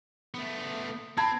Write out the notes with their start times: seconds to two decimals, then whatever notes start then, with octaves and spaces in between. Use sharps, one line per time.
0.34 A3 B3
1.17 C4 A5 B5 G#6